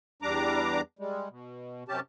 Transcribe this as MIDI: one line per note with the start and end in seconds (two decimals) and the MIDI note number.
0.22 0.81 40
0.22 0.81 55
0.22 0.81 62
0.22 0.81 82
0.22 0.81 86
0.99 1.28 55
0.99 1.28 56
1.30 1.84 47
1.88 2.00 42
1.88 2.00 48
1.88 2.00 61
1.88 2.00 67
1.88 2.00 81